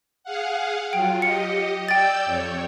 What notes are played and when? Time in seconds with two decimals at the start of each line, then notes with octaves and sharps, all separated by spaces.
0.24 G#4 F5 F#5
0.93 F#3 F4 G5
1.22 G4 D#5 C#7
1.88 D5 G5 E6 G6 A6
2.26 F2 C#5